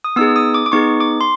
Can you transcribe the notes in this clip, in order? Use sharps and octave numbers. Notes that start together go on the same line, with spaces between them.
D#6
B3 D#4 G#4 E6
D#6
D6
D6
B3 D#4 G#4 C#6
D6
C6